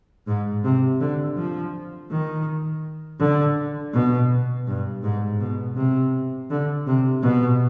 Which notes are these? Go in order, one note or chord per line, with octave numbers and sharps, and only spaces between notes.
G#2
C3
D3
F3
D#3
D3
B2
G2
G#2
B2
C3
D3
C3
B2